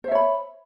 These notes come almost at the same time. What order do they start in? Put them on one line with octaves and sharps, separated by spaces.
C5 E5 C#5 B5